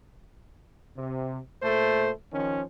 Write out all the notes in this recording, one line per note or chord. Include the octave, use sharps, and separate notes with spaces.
C3
A#2 A3 A4 C5
D#3 F3 C#4